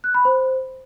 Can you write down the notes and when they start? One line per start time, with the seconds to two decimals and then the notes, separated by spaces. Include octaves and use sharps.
0.04 F#6
0.14 B5
0.25 C5